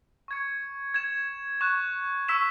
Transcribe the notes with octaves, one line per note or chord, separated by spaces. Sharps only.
C#6 G#6 C#7
G#6 E7
C#6 F#6 E7
C#6 E6 B6 E7